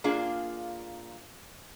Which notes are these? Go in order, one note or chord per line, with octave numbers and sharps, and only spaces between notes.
A#3 D4 F4 G#4 F5